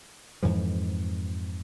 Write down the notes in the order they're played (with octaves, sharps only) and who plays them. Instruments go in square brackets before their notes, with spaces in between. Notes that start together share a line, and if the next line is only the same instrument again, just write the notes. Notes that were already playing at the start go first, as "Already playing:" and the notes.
[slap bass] F2 G#2 E3 F3